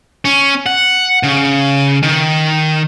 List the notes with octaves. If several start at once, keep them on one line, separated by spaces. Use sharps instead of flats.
C#4
F#5
C#3
D#3